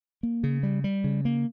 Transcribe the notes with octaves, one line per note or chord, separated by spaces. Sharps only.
A#3
C#3
G3
G3
C#3
A#3